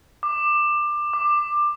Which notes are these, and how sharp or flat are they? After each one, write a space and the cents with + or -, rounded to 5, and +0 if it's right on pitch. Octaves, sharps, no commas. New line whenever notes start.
D6 +20
D6 +15